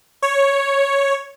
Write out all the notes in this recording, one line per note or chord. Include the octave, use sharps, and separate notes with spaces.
C#5